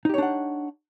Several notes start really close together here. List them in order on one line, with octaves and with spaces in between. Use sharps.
D#4 G4 C#5 D4 F#5